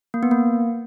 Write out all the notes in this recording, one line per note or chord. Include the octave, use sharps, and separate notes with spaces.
A#3
B3
A#3